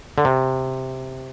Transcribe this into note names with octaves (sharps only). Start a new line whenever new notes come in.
D3
C3